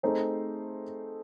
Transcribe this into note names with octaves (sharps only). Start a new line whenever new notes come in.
A3 C4 D#4 G#4 C5